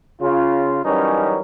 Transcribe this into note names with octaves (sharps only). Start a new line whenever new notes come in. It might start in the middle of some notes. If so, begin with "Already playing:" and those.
C#3 F4
F#2 E3 G3 C#4 D#4 A#4